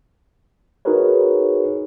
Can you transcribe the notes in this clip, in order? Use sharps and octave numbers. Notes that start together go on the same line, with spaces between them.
D#4 F#4 G#4 A#4 B4 C#5